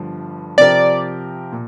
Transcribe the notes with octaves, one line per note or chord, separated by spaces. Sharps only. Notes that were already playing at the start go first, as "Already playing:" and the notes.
Already playing: G1 G2 D3 F3
C3 F3 C4 G4 A#4 D5
A#2